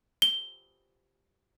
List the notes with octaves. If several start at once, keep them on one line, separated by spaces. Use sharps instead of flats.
G7